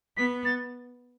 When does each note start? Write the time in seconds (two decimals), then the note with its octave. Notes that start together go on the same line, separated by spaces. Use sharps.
0.17 B3 B6
0.45 A6